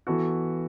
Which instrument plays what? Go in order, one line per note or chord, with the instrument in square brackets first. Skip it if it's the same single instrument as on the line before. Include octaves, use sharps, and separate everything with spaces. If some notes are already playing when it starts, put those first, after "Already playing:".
[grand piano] E3 B3 F#4 A4